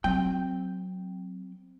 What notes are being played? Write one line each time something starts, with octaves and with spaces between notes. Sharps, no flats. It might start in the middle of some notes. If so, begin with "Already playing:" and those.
F#3 C4 G5